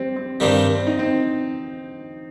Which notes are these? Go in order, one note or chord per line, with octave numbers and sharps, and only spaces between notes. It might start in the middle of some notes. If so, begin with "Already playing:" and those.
Already playing: G3 C4
C4
G2 D#3 G3 C4
C4
D#4
C4